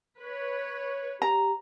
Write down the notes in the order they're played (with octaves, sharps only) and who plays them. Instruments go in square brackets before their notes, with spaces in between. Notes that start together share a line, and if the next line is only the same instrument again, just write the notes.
[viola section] B4 C#5
[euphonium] G4 [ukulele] A#5